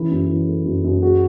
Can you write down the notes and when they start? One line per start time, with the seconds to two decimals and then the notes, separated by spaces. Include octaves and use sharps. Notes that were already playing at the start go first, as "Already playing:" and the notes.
Already playing: E3 C#4 E4
0.11 F#2
0.29 E3
0.48 A3
0.66 F#2
0.84 F#2
1.02 G#3 F#4